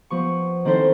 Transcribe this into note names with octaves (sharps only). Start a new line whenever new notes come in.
F3 B3 C#6
D#3 C4 E4 A4 C5